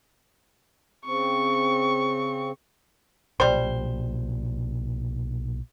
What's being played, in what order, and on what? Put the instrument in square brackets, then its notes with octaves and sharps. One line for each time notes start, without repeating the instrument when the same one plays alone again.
[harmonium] C#3 C4 [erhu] C#6
[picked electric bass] B1 A#2 [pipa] G3 C5